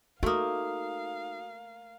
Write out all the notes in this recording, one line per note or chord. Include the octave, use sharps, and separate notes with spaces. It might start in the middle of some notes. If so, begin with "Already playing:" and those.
A3 A#3 D#4 F#4 F5 D#6